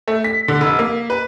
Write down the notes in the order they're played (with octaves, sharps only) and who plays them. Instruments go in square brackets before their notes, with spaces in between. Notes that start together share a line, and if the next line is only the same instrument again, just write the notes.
[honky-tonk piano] A3
B6
D3
F1
A#3
B4